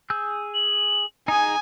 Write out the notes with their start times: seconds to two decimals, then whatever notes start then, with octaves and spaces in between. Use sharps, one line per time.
0.10 G#4 E6 G6
0.54 F#7
1.28 D#4 G#4 G#5 D#6